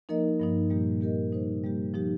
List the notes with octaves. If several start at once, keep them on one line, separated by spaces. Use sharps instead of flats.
F3 A#3 D#4 A#4 D#5
G2 F3 A#3 D#4
A#2 G3 A#3 G4
A#3 G4 A#4 D#5
C3 G3 D#4 C5
G3 A#3 G4
F3 D#4 G4